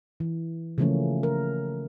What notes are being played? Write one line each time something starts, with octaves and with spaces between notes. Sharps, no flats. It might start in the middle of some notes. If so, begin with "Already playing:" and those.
E3
C#3 E3 F3 A3 A#3 C#4
A#4